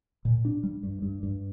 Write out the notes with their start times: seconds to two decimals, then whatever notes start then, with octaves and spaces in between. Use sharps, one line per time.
0.25 A#2
0.45 D4
0.63 G3
0.83 G2
1.02 G2
1.23 G2